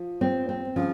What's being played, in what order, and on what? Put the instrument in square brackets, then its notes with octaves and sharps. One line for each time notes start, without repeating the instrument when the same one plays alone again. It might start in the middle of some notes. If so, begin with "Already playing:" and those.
Already playing: [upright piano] F3
[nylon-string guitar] C4
C4
[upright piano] C#3 [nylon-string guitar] F3